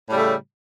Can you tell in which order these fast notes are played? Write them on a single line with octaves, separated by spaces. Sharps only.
A2 G3 C#3 A3